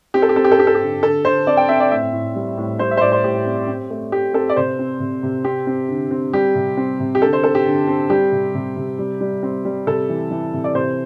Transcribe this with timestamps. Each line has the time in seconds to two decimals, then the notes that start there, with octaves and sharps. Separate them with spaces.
0.14 C4 G4
0.22 A4
0.29 G4
0.36 C4 A4
0.44 G4
0.52 A4
0.58 C4 G4
0.67 A4
0.75 G4
0.81 D3
1.03 D3 A4
1.25 D3 C5
1.47 C4 D5
1.57 G5
1.69 C4 E5
1.80 D5
1.91 A2 E5
2.13 A2
2.36 G3
2.58 A2
2.79 G3 C5
2.91 E5
2.97 C5
3.01 A2 D5
3.12 C5
3.23 A2 G4
3.46 C4
3.67 C4
3.90 A3
4.12 A3 G4
4.34 C4 A4
4.50 D5
4.56 C3 C5
4.79 C4
5.00 C3
5.23 C3
5.44 C4 G4
5.67 C4
5.88 D3
6.11 C4
6.33 G3 G4
6.55 C3
6.77 C4
7.00 C3
7.15 G4
7.22 D3 A4
7.33 C5
7.44 C4 A4
7.55 G4
7.66 D3
7.87 C4
8.10 G3 G4
8.32 C3
8.55 C3
8.76 C3
8.99 G3
9.21 G3
9.43 C4
9.65 G3
9.87 C3 A4
10.09 E3
10.31 E3
10.54 C3
10.64 D5
10.75 C3 C5